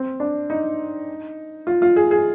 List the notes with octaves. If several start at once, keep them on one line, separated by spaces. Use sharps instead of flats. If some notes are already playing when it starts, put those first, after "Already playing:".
Already playing: C4
D4
D#4
F4
F4
G#4
G#4